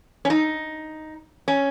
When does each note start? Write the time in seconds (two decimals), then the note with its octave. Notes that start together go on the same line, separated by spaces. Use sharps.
0.25 C#4
0.30 D#4
1.48 C#4